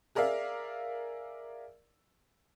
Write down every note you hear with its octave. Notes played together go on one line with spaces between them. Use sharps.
G#4 A#4 D5 E5 F5